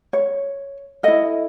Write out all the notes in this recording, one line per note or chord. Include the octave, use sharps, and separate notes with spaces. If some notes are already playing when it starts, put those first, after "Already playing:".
C#5
E4 A4 D#5